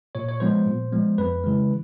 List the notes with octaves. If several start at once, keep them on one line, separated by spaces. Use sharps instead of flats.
A#2 C#5
C#5
F3 G#3 B3 C5
A#2
F3 G#3 B3
F2 B4
C#3 E3 G#3